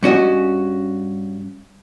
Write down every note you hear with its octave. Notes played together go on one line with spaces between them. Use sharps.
G2 C#4 F#4 D#5